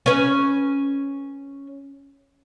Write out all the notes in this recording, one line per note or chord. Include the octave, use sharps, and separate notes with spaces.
C#4 B4